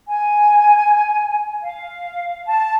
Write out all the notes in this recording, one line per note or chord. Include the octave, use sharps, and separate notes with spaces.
G#5
F5
A5